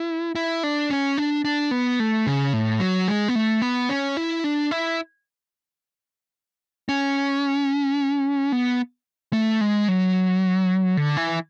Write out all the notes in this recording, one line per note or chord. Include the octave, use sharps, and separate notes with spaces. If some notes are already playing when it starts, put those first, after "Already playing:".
Already playing: E4
E4
D4
C#4
D4
D4
B3
A3
C#3
A2
F#3
G#3
B3
A3
B3
C#4
E4
D4
E4
C#4
B3
A3
G#3
F#3
D3
E3